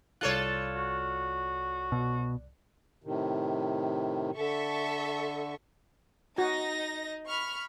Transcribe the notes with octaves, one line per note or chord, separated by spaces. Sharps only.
C2 F4 A4 C#5 D5 F#6
F#4
B2
A2 C3 D#3
D3 A4 E5 C#6
D#4 F#4 D#5 A#6
B5 C#6 F6